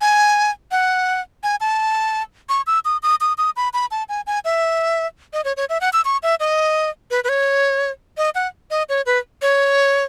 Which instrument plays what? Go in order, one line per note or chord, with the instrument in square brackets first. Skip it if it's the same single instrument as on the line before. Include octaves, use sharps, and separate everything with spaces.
[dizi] G#5
F#5
G#5
A5
C#6
E6
D#6
D#6
D#6
D#6
B5
B5
A5
G#5
G#5
E5
D#5
C#5
C#5
E5
F#5
E6
C#6
E5
D#5
B4
B4
C#5
D#5
F#5
D#5
C#5
B4
C#5